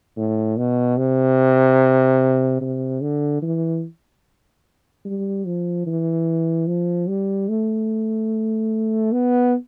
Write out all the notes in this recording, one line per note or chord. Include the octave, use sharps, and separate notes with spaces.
A2
B2
C3
C3
D3
E3
G3
F3
E3
F3
G3
A3
B3